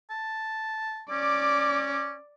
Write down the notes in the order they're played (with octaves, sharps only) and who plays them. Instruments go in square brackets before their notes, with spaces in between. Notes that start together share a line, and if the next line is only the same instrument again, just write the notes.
[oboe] A5
[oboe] C#4 [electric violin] D5 D6